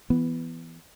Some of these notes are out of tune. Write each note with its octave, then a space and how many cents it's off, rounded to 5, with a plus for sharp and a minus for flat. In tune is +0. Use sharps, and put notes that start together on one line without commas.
E3 +20 B3 +0